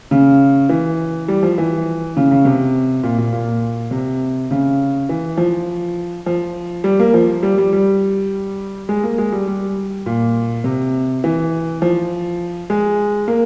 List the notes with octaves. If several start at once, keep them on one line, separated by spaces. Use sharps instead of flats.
C#3
E3
G3
F3
E3
C#3
C#3
C3
A#2
A#2
A#2
C3
C#3
E3
F3
F3
G3
A#3
F3
G3
G3
G3
G#3
A#3
G#3
G3
G3
A#2
C3
E3
F3
G#3
A#3